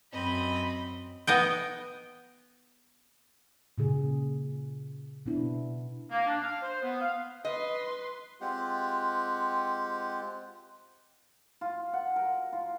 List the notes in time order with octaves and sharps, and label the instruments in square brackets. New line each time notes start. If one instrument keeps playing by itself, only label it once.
[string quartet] F#2 C4 D#5 B5
[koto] B3 D#5 G5
[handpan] A#2 C#3 G#4
B2 B3 D4 E4
[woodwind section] A#3
D4
F5
C5
B3
F5
[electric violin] B4 C6 [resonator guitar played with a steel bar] D#5
[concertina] G#3 C4 F4 G4 F#5
[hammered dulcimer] F4
F#5
A#4
F4